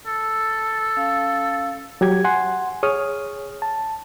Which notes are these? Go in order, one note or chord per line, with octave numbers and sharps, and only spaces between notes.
A4
C#4 F5
F#3 G4 G#6
F#5 G#5 C6
G#4 C#5 D#6 F6
A5